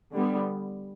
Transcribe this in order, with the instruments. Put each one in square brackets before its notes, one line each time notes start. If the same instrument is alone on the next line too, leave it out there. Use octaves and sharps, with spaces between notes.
[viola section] D3 G3 B3